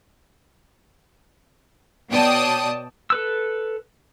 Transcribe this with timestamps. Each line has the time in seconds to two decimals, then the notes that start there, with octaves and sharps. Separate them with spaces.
2.10 B2 C#5 D5 G5 A5 D#6
3.10 A4 B4 E6